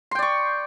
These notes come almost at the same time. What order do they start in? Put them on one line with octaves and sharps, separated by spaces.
C6 G5 D5 C#6